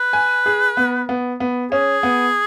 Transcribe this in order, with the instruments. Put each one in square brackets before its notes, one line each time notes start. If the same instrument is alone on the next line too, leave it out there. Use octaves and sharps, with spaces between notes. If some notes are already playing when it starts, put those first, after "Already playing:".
Already playing: [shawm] B4
[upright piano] G#5
G#4
B3
B3
B3
[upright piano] C#4 [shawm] G#4
[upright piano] B3